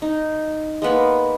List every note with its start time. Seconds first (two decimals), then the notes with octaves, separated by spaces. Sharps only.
0.02 D#4
0.82 G#3 A#3 B3 B4